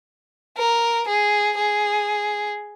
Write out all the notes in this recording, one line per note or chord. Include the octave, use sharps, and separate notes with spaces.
A#4
G#4
G#4